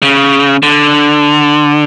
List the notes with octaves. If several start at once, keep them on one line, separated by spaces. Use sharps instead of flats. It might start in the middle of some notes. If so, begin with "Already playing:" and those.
C#3
D3